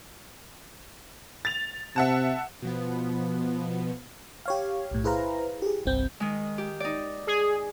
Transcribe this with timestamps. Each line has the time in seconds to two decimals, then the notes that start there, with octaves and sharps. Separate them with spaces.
1.45 A6 F7
1.96 C3 E5 F#5 A5
2.62 B2 F3 B3
4.46 G4 C#5 F5
4.91 B1 A2
5.04 E4 G#4 B4 C5 F5 A#5
5.62 G4 G#4
5.86 G1 C2 C4 G6
6.20 D#3 G#3
6.58 G4
6.80 D#4 D5
7.27 G#4